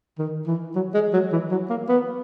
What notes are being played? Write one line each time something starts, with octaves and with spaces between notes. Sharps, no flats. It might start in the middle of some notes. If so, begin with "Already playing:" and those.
D#3
E3
F#3
G#3
F#3
E3
F#3
A#3
B3